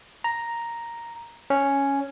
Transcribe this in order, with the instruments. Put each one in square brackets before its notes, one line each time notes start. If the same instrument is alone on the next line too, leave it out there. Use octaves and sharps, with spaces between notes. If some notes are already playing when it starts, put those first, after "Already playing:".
[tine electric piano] A#5
C#4